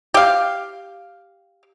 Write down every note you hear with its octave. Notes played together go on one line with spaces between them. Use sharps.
G4 F5